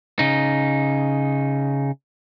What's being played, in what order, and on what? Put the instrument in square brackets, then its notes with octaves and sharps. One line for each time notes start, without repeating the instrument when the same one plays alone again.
[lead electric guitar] C#3 D#4